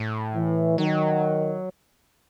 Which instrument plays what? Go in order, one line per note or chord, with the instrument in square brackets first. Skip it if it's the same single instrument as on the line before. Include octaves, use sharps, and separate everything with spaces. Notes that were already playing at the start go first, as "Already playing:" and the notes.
Already playing: [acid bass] A2
[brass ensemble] E3
[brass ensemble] D#3 [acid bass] F#3